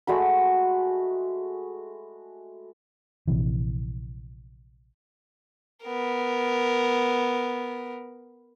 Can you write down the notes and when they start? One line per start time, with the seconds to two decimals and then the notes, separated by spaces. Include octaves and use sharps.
0.07 G#3 A3 F#4 B5
3.28 A#1 C3 E3
5.84 B3 A#4